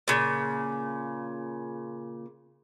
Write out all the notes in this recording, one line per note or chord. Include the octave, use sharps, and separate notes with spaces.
A#2 C#3